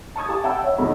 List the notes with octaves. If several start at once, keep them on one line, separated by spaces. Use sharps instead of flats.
A5 C#6 D#6 G#6
G4 F5 G#5 A5 D6
E5 F#5 G5 A5 B5 E6
C#5 E5 F#5
B1 E2 D#3 F#4 B5